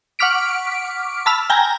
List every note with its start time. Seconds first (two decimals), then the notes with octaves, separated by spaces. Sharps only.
0.19 F#5 C#6 D6 F6 B6 D7
1.26 A5 B5 E6 F6
1.50 G5 G#5 A#5